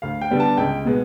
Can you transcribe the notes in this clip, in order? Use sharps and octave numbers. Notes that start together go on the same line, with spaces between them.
D2 F5
G5
D3 G3 B3 D4
A5
C#2 G5
B2 G#3 B3